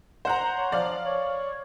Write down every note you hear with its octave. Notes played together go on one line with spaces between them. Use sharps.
C5 F#5 A#5
C#5
F3 D5 F5
C#5